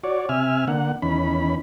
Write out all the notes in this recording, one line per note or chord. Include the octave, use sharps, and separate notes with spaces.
F#4 C#5 D5
C3 E5 G#5 F6
D3 A#3 F#5
E2 D#3 C#4 B5